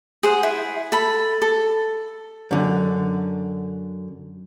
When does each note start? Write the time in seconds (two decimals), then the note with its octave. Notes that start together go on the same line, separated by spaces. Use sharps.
0.23 G#4 C5 F#5
0.43 E4
0.92 A4 B5
1.42 A4
2.51 F#2 D3